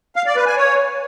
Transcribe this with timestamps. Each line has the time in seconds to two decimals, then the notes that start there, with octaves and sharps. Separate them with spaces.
0.16 F5
0.26 D5
0.36 B4
0.46 G#5
0.57 C#5